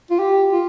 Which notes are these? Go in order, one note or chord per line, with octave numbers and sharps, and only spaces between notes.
F4
G4
F4